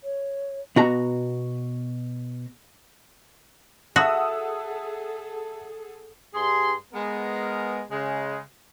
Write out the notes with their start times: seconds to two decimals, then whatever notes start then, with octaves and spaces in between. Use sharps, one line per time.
0.04 C#5
0.76 B2 F#4 A#5
3.96 F#4 G#4 A4 E5 F#5 A5 D#6 E6
6.34 G2 G#4 C6
6.93 G#3 B3 A#4
7.90 C#3 G#3